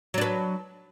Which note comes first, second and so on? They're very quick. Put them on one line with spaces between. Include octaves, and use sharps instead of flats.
F#3 D4 B4